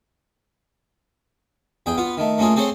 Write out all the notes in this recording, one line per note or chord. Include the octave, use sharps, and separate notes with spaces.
E2 G#4 G5
B3 F4
D#3 A3
A3 A#3 C#4 F4 G#4
C4 G#4 A4 C5 C#5 C6